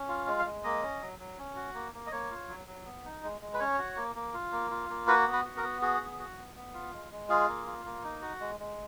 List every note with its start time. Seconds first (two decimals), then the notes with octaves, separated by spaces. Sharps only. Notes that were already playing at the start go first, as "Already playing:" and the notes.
Already playing: C#4
0.08 F4
0.27 G#3
0.39 F5
0.45 G#3
0.64 A#3 D#5
0.82 C#4
1.01 F#3
1.19 F#3
1.38 C#4
1.56 F#4
1.75 A#3
1.94 A#3
2.07 D#5
2.11 A#3 C#5
2.31 F4
2.49 F#3
2.67 F#3
2.85 B3
3.05 D#4
3.23 G#3
3.41 G#3
3.54 B4
3.60 C#4 C#5
3.78 F#4
3.96 A#3
4.16 A#3
4.34 F4
4.52 A#3
4.71 F4
4.90 A#3
5.07 F#4 B4
5.27 B3
5.33 B4
5.45 F#4
5.57 A#4
5.63 B3
5.82 F#4 G#4
6.00 B3
6.19 F#4
6.37 B3
6.56 B3
6.74 F4
6.93 G#3
7.12 G#3
7.29 F4 G#4
7.48 A#3
7.67 F4
7.85 A#3
8.04 D#4
8.22 F#4
8.40 G#3
8.60 G#3